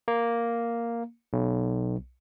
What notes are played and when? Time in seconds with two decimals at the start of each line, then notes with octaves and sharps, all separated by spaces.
0.08 A#3
1.33 B1